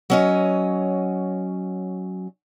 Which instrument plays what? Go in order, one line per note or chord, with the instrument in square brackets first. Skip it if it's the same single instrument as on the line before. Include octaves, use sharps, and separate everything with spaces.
[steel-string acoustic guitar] F#3 C#4 D#5